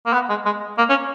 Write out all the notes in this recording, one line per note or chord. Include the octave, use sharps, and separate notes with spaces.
A#3
B3
G#3
G#3
A#3
C#4